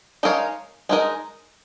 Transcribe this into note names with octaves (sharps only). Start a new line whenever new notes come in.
G#3 D#4 A#4 C#5 F5
G#3 D#4 A#4 D#5